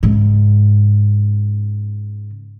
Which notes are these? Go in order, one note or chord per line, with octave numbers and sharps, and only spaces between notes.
G#2 C#3